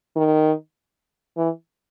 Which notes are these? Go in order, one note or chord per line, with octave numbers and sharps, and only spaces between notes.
D#3
E3